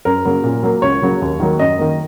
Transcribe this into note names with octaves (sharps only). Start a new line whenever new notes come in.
F#2 A#4
C#3 F#3 A#3
A#2
F#3 A#3
C#2 C#5
C#3 F#3 A#3
D#2
D#3 F#3 A#3
F#2 D#5
D#3 A#3